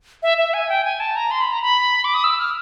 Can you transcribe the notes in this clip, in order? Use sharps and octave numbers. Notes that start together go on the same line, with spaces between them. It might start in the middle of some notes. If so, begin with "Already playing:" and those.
E5
E5
G#5
G5
G#5
A5
A#5
C6
B5
A#5
B5
D6
D#6
E6
F6